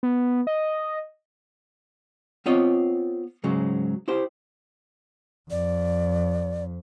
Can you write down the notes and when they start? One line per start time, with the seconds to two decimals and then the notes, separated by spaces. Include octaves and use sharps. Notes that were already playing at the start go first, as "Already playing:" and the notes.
0.03 B3
0.47 D#5
2.46 B3 C4 F4 C#5 D#5
3.44 G#2 C#3 F#3 G#3
4.08 E4 G4 C5
5.51 F2 D5